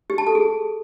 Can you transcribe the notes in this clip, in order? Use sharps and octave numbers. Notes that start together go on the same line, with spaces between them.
G4
A5
A4
G#4